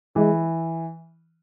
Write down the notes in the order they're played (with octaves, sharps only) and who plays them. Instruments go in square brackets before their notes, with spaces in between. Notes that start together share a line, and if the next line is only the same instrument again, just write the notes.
[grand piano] E3 [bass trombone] G#3